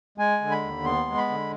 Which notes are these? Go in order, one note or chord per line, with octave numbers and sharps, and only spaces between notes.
G#3 G#5
D3
B5
D#2
B3 C6
G#3
B5
D3